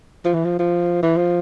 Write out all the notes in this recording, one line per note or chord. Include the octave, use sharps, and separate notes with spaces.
F3
E3
F3
F3
E3
F3